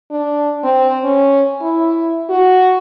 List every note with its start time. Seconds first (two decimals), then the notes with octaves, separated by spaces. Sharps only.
0.11 D4
0.64 C4
1.04 C#4
1.62 E4
2.30 F#4